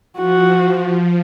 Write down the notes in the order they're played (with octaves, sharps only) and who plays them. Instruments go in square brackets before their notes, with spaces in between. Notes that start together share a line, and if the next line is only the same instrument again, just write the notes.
[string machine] F3 [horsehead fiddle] F#4